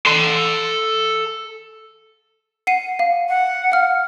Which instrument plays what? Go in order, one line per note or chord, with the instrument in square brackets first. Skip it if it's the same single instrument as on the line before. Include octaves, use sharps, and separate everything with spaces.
[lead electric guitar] A4 C6
[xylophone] F#5 C7 D#7
F5
[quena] F#5
[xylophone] F5 F6